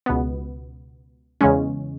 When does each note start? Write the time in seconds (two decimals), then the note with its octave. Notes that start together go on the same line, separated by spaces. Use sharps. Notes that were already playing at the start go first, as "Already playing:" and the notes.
0.06 C#2 B2 B3
1.41 E2 C#3 G#3 C#4